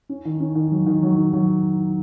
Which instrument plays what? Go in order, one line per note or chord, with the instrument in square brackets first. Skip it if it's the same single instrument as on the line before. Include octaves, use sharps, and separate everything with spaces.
[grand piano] C#4
D#3
C#4
D#3
F#3
D#3
F#3
D#3
F#3